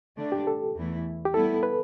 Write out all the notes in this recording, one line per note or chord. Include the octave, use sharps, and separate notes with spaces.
D3 A3 D4
G4
A4
E2 E3 A3 E4
G4
A2 G3 B3 E4 A4
B4